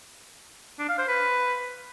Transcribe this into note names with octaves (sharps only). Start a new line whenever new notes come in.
D4
F5
C5
B4